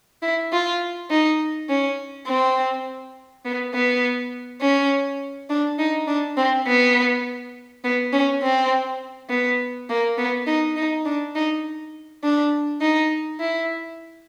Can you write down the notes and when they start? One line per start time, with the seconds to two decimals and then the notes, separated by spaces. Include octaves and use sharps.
0.22 E4
0.52 F4
1.10 D#4
1.69 C#4
2.28 C4
3.45 B3
3.74 B3
4.62 C#4
5.50 D4
5.79 D#4
6.08 D4
6.37 C4
6.67 B3
7.84 B3
8.13 C#4
8.43 C4
9.30 B3
9.89 A#3
10.18 B3
10.47 D#4
10.76 D#4
11.05 D4
11.35 D#4
12.23 D4
12.81 D#4
13.40 E4